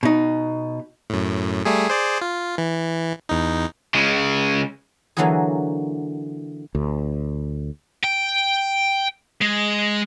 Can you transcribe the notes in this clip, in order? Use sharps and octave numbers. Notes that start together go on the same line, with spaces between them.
B2 D#4
F#2 A2
G3 A3 G#4
G#4 C5 D5
F4
E3
E2 D#4
C#3 G#3
D3 E3 F#3 A#3 F#4 G#4
D2
G5
G#3